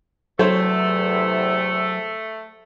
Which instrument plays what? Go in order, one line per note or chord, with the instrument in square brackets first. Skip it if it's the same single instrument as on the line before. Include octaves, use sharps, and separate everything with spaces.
[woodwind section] E2 C3 [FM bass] F#3 [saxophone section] A3 [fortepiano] A4 C5 C#5